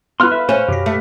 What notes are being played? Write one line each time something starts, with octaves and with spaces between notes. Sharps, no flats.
B3 E4 B4 F5 C6 F6 F#6
E5
A3 C#4 C5
F#2 B2 G4 A#6
A3